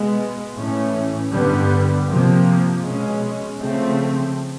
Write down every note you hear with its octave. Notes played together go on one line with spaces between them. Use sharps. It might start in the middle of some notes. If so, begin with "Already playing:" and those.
Already playing: B2 G#3 B3
A2 E3 A3 C#4
G2 D3 G3 B3
C3 F3 A#3
B2 G#3 C#4
C#3 F3 A3 C4